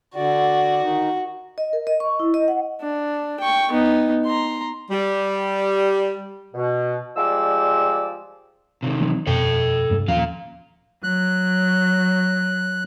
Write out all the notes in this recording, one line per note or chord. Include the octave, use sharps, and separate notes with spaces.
D3 F#4 D5
D#3 D#4
D#5
A#4
D#5
C#6
E4
D#5
F#5
D4
G5 C#6
B3 D#4
A#5 C6
G3
B2
F3 G3 G#3 D5 E6
C3 D#3
E3 F#3 C4
F2 B2 A4 G5
F1 G2 G3
D#2 A#2 F3 C#4 F5
F#3 F#6